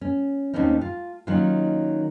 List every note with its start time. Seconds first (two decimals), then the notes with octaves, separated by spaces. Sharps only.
0.01 C#4
0.54 D#2 B2 A3 C4 C#4 D#4
0.81 F4
1.27 D#3 F#3 A#3 C#4 D#4 F4